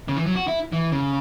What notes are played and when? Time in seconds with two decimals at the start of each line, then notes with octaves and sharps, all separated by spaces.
0.08 C#3
0.17 E3
0.26 F#3
0.36 F#4
0.47 E4
0.72 E3
0.92 C#3